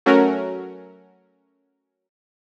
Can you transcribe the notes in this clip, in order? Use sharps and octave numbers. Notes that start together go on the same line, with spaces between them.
F#3 A3 C#4 F#4 A#4